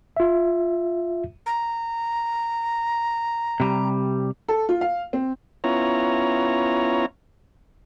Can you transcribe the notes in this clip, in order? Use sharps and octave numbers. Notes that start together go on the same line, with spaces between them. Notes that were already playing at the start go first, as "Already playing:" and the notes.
F4 E5
A#5
C3 G3
A4
F4
F5
C4
B3 C#4 E4 F4 C#5 A#5